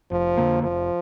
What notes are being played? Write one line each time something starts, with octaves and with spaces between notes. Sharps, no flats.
F1 F3
F2 D3 A#3
F1 F3